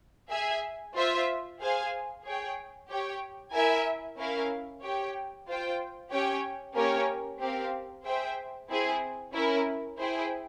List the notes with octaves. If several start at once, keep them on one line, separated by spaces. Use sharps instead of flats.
G#4 E5 G#5
F4 C5 E5
G#4 C5 F5 G#5
G#4 C#5 G5
G4 C#5 G5
E4 A#4 E5 G#5
C#4 E4 A#4 F5
G4 C#5 G5
F4 C5 G5
C#4 G4 C#5 G5
A#3 C#4 G4 A#4 C#5
C4 G4 A#4 F5
G#4 C5 E5 G5
C4 E4 G#4
C#4 E4 A#4
E4 G#4 C5 G5